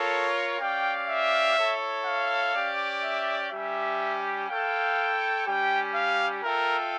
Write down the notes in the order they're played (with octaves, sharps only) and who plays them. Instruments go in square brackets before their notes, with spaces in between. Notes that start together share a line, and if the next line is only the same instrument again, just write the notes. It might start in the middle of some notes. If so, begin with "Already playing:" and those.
Already playing: [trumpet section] F4 A#4 C#5 [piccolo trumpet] A4
[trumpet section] C#4 G4 D5 F5 [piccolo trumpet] G5
[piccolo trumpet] E5
[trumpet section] E4 A4 C#5
[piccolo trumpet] F5
[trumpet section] C#4 G4 D5
[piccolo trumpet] E5
[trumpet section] G3 C#4 G4 [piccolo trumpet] E5
[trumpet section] E4 A4 C#5 G5 [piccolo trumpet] F5
[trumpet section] G3 C#4 G4 [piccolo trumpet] G5
[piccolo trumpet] F5
[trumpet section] F4 A4 E5 G5 [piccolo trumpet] A#4